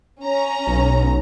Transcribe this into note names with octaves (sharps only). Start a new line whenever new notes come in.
C#4 A#5
B1